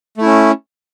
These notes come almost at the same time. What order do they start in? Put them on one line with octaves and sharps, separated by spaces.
A3 E4 C#4